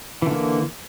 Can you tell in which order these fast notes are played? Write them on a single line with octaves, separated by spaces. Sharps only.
E3 D3 A#3